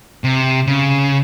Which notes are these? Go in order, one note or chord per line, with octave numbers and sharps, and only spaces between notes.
C3
C#3